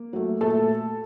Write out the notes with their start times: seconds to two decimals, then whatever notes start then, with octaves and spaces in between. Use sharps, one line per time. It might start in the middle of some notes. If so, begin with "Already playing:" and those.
Already playing: A#3
0.13 F#3 A3
0.41 A#2 A3 A4